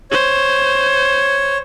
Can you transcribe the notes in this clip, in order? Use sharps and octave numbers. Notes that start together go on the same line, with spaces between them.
C5 C#5